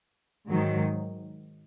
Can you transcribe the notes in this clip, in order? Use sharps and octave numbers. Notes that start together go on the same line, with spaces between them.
G#2 D#3 F#3